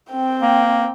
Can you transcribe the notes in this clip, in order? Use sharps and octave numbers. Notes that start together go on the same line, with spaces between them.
C4 G5
A#3